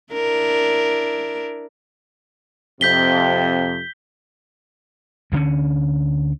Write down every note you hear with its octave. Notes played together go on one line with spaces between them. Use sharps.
D4 E4 A#4
F2 C3 G6 B6 G7
D2 D3 C4 C#4